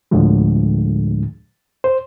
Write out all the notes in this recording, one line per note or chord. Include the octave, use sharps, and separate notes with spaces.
D2 A2 D3 F3 G#3
C5